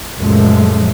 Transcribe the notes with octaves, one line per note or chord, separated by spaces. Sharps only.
C#2 F#2 A#2 F3 G#3 A3